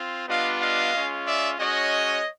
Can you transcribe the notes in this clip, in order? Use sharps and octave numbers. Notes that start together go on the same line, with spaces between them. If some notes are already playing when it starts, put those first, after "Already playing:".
Already playing: C4 F4
G3 B3 D4 F4 D#5 F5
D#5 F5
G#3 C#4 F4
D5 E5
G#3 C#4 F#4 C#5 D#5